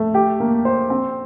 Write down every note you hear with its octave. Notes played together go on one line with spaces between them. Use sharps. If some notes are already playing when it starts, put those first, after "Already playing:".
Already playing: A3
G4
A#3
C5
C4